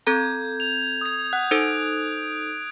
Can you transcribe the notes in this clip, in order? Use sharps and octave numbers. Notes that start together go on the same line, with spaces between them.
C4 A4 A#5 G6 G#6
F7
D#6 G#6
F#5 F#6
D#4 A4 C5 D7